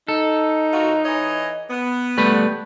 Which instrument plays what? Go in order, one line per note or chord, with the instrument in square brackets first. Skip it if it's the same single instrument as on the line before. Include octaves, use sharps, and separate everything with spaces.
[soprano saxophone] D#4 [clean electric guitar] A4
[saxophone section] D#2 F4 F#4
E3 C#5 D#5
B3
[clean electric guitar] G3 A3 B4